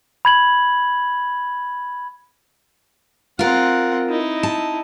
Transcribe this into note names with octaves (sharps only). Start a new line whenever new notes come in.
B5 G#6 F#7
C4 F4 A#4 F#5
D#4 E4
A5